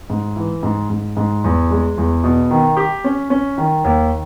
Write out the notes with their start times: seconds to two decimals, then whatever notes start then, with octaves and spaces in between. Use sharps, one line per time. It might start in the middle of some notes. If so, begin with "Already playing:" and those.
0.10 G#2
0.36 E3
0.63 G#2
0.90 G#2
1.17 G#2
1.44 E2
1.71 G#3
1.98 E2
2.24 B2
2.51 D#3
2.77 G4
3.04 C#4
3.30 C#4
3.58 D#3
3.85 D#2